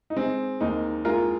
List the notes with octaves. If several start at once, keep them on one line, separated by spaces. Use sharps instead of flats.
D#4
G#3 C4
D#2 A#3 D#4
G#3 F4 A#4